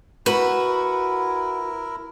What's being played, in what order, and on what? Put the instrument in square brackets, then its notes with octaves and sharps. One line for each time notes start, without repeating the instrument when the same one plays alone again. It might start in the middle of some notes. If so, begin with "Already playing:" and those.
[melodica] E4 A#4 [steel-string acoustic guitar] F#4 [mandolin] B4